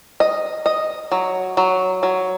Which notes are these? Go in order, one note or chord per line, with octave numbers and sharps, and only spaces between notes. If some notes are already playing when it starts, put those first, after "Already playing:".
D#5
D#5
F#3
F#3
F#3